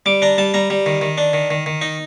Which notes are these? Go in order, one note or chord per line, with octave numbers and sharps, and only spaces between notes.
G3 D6
D4 A#5
G3 A5
G3 A#5
G3
D#3
D#3
D4
D#3
D#3
D#3
D#4